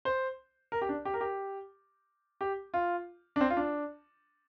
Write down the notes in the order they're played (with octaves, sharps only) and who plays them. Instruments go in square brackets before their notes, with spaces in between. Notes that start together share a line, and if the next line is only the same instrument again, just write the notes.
[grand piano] C5
A#4
G4
D4
G4
A#4
G4
G4
F4
D4
C4
F4
D4